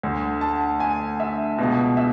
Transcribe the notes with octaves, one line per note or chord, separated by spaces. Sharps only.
D2 D3
A5
G#5
E5
C#2 B2
E5